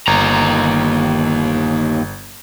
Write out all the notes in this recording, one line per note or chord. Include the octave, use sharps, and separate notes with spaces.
G1 D#2 A#5